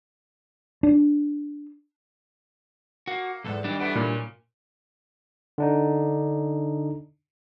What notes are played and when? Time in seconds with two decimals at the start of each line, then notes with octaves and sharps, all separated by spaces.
0.83 D4
3.07 A#3 F#4
3.44 B1 E2 G#2 A4
3.64 D#3 G3 D4
3.80 E3 A3 B3 D7
3.95 A#2 C#4 E4
5.58 D3 D4 D#4